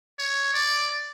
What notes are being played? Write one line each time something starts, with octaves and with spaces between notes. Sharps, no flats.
C#5
D5